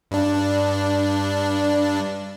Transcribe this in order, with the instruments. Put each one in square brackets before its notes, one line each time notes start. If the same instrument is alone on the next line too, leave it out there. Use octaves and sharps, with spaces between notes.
[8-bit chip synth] G2 D4